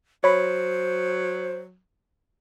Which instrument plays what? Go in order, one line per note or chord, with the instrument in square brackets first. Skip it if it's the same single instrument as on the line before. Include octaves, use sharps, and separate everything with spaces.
[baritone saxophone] F#3 [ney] C5 [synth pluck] C#5 B5